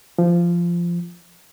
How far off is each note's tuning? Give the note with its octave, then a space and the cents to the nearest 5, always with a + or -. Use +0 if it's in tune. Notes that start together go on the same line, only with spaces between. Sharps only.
F3 -15